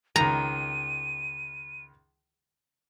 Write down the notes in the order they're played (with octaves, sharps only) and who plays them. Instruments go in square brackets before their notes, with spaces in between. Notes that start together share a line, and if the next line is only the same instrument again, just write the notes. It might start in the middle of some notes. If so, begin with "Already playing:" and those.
[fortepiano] C#2 D#3 [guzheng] A#5 [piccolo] D#7